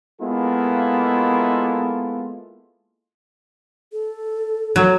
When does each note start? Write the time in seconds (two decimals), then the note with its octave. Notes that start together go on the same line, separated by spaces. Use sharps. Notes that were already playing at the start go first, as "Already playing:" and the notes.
0.21 G#3 A#3 B3 E4 F4 A4
3.93 A4
4.76 F#3